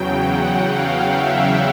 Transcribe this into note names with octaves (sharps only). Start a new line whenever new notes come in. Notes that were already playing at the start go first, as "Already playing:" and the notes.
Already playing: E2 C#3 F#3 G5
F#5
F5
E5